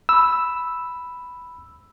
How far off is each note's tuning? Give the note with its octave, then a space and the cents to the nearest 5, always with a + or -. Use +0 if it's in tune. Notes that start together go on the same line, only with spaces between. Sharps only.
B5 +0 E6 +0